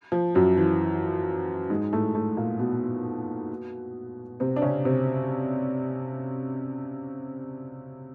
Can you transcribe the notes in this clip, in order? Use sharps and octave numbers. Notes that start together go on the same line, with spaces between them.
F3
F#2 F#3
E3
G#2 G#3
A2 A3
A2 A3
A#2 A#3
B2 B3
C3 C4
D4
C#3 C#4
C3 C4